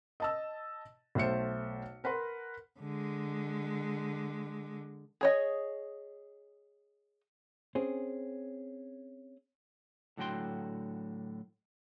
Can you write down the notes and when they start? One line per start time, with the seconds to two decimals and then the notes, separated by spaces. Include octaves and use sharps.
0.20 D#5 A5 E6
1.15 B1 A3 C5 C#7
2.04 A#4 B4 F#5 C6
2.80 D3 G#3
5.21 G#4 C#5 D#5
7.75 C4 C#4 G#4
10.17 A2 D3 F#3 F#4 G5 C6